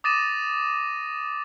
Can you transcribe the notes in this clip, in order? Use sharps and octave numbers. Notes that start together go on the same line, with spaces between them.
D6 D#6 A6 A#6 D#7 E7